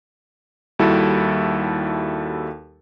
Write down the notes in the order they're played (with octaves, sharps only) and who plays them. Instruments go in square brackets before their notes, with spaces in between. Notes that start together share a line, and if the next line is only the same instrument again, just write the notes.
[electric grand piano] D#2 G3 E4 F#4 A4